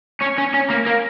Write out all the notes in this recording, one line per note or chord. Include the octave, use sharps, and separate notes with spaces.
C#4
C#4
C#4
A#3
A#3